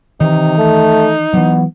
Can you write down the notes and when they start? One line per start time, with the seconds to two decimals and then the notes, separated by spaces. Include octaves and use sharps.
0.21 C3 D#3 E3 D#4
0.58 A3
1.34 E3 F#3 B3